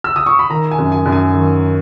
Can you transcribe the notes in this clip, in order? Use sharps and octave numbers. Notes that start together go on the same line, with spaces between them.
E6
D#6
C#6
B5
D#3 A#5
G#5
F#2
G#5
F#2
G#5
D#3